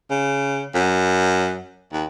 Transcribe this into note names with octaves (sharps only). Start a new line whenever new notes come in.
C#3
F#2
D#2